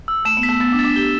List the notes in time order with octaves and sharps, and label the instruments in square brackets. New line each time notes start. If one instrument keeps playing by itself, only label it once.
[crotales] E6
[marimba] A3 [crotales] E7
[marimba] B3
[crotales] B6
[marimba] A3
[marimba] B3 [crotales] A6
[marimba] D4
[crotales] A6
[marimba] D4
[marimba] G4 [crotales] G7